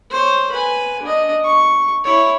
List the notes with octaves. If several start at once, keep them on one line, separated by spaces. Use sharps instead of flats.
C5 C#5
B4 G#5
D4 D#5
C#6
E4 C#5